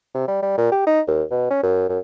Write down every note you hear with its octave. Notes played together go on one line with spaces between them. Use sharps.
C3
G3
G3
A#2
G4
D#4
D#2
B2
C#4
F#2
F#2